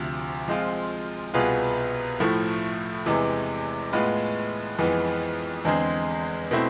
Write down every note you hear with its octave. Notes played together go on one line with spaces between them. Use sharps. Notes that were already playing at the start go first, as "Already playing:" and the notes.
Already playing: D2 C3 F3
F3 G#3 C4 F4
C2 B2 B3 F4 G#4
A2 F3 A3 E4
E2 C3 E3 G#3
A2 G#3 B3 F4 B4
F2 E3 G#3 B3
E2 D3 G#3 C4 G#4
B2 A3 C4 E4